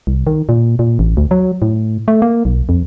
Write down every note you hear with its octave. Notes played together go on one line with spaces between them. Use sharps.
C2
D#3
A#2
A#2
A1
D2
F#3
A2
A3
A#3
B1
F2